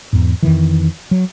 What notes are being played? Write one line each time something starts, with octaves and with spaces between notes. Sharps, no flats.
E2 G#2
F2 D#3 E3
F#3